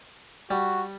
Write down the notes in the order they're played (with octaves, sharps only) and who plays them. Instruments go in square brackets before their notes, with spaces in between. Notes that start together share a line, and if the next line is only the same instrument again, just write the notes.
[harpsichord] G3 [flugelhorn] F#4